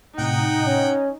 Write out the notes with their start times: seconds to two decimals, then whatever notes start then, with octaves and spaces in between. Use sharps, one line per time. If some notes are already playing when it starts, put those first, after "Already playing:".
0.18 A2 C3 D#4 F#5 G5
0.67 C#4